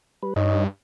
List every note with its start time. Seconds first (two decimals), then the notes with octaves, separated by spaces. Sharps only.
0.23 G3 B4
0.36 G2 D#4 C#5 D#5